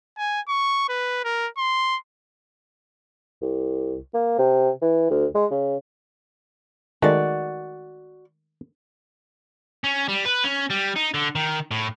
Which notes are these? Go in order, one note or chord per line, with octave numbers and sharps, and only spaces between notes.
G#5
C#6
B4
A#4
C6
C2
A#3
C3
E3
D2
G#3
C#3
D#3 G#3 A3 F#4 D5
C#4
G3
B4
C#4
G3
D#4
D3
D#3
A2